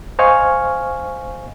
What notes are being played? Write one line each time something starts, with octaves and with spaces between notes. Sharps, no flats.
C5 D#5 F5 G#5 C#6 F6